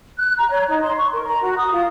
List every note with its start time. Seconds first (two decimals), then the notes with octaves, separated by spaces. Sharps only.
0.17 F#6
0.37 A#5
0.50 C#5
0.68 D#4
0.81 C6
0.96 C#6
1.11 A#4
1.25 A#5
1.42 F#4
1.57 D#6
1.72 F4